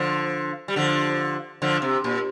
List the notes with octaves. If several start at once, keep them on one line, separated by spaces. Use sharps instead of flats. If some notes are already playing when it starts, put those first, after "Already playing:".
Already playing: D3 F3
G3
D3 F3
D3 F3
C3
A#2